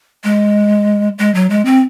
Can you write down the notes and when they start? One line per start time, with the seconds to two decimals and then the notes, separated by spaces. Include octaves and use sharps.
0.24 G#3
1.19 G#3
1.35 F#3
1.50 G#3
1.65 C4